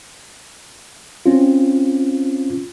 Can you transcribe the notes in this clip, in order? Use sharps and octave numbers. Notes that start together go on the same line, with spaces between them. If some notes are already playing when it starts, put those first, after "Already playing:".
C4 C#4 F4